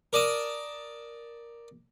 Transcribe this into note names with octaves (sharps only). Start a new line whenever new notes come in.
A#4 D5 A5 D#6